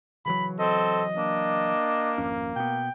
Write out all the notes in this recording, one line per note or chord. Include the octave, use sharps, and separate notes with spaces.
C#3 E3 F#3 B5
C4 A4 D#5
A#3 D4
G#1 F2 C#4
B2 B3 G5